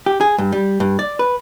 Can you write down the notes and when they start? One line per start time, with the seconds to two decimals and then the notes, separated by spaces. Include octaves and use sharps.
0.06 G4
0.21 G#4
0.38 G2
0.52 G3
0.80 G2
0.99 D5
1.19 B4